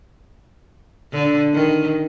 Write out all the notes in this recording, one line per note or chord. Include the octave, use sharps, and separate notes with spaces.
D3
D#3